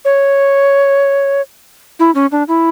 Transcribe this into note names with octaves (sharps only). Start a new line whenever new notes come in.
C#5
E4
C#4
D4
E4